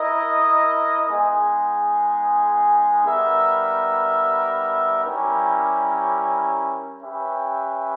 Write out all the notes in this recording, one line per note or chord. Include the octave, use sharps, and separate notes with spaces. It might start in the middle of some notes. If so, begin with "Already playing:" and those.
Already playing: E4 A#4 D#5
G#3 B3 D#4 G#4
G3 B3 D#4 A#4 E5
G3 C#4 E4 G4 A#4
C#4 G4 B4 E5 G5